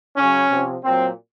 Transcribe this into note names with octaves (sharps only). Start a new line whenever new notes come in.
C#3 F#3 C#4
C3 F3
A#2 F#3 C4